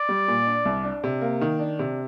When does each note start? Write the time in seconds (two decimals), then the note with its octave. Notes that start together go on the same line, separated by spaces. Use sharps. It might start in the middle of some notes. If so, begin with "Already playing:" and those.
Already playing: D5
0.09 G3
0.28 A#2
0.47 D4
0.65 C2
0.84 D4
1.04 C3
1.21 A#3
1.41 D#3
1.59 D4
1.79 C3